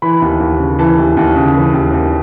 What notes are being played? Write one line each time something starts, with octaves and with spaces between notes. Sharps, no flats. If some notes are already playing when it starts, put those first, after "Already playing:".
E3 B5
D#2
D#2
C#3
E3 A5
D#2
D#2
C#3
E3
D#2
D#2